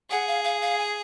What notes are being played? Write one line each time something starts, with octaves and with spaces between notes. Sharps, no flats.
G#4 F#5
F5
F5
F5
G#5